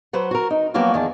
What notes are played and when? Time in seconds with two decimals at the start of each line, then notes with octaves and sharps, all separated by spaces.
0.13 F#3 B4 C5 F#5
0.31 F#4 A#4
0.51 D#4
0.74 F3 F#3 A#3 B3 F#4 G4
0.94 E2 D#3 G#4 A5